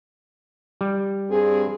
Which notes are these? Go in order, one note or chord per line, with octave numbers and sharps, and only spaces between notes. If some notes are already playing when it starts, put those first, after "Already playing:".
G3
G2 C4 G#4